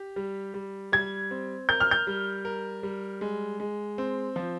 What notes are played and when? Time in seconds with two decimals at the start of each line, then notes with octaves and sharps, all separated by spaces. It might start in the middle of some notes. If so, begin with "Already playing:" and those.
Already playing: G4
0.16 G3
0.54 G3
0.92 G3 G#6
1.31 C4
1.69 A#4 G6
1.80 F6
1.91 G6
2.07 G3
2.45 A#4
2.83 G3
3.21 G#3
3.60 G#3
3.98 C4
4.36 F3